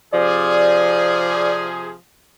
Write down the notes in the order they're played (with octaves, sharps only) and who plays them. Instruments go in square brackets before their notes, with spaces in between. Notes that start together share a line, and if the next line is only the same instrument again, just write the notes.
[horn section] C3 F3 G#4 [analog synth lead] D5